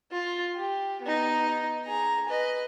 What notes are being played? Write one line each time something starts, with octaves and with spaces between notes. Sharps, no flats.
F4
G4
B3 D#4
G#4 A#5
B4 D#5